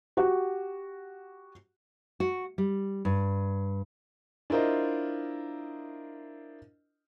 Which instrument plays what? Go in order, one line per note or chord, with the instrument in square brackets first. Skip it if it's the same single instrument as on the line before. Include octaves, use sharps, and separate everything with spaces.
[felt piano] F#4 G4
[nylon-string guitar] F#4
G3
G2
[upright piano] D4 E4 F4 A#4 C5 D#5